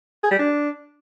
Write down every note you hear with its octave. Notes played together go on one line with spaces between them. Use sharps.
G#4
G3
D4